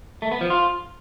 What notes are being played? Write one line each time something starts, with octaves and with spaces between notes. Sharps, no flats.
A3
B3
F3
F4